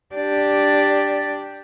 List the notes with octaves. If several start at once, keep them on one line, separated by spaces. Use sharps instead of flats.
D4 G4